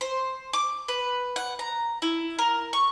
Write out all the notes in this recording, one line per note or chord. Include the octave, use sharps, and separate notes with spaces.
C5
D6
B4
F#5
A#5
E4
A#4
C#6